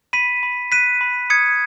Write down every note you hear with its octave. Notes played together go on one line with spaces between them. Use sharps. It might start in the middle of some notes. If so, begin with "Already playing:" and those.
B5 B6 D#7
B5
F#6 B6 D#7
B5
D#6 G#6 C#7